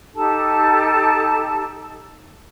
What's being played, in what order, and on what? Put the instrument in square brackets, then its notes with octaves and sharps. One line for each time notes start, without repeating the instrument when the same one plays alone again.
[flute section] D#4 G4 A4 A5